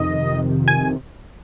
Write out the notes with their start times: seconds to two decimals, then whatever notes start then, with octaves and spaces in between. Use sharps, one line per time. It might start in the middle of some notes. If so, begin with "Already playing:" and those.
Already playing: F2 C3 D#3 D#5
0.68 G#5